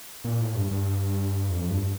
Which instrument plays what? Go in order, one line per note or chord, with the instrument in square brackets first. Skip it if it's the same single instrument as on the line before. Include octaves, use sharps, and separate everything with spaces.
[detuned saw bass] A#2
A2
G2
G2
F2
G2